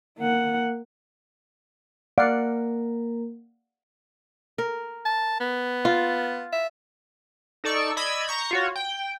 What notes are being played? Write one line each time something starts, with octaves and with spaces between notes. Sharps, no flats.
A#3 F#5
A#3 A#4 D5 F5 F#5
A#4
A5
B3
F4
E5
D#4 A4 D5 C#6 E6
D5 D#5 B5 E6 G#6
A#5 C#6 G6
F4 F#4 C#5
G5